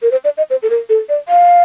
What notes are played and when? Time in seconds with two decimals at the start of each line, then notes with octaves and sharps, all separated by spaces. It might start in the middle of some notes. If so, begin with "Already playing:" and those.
0.02 A#4
0.11 C5
0.24 D5
0.37 D#5
0.50 C5
0.63 A4
0.70 A#4
0.89 A4
1.09 D5
1.29 F5